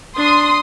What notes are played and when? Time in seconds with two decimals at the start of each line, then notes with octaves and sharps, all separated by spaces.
0.17 D4 C6 D#6